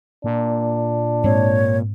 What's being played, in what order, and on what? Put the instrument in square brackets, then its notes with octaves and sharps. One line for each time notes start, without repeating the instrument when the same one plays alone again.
[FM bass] A#2 [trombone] D4
[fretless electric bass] G#2 G#3 C4 [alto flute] C#5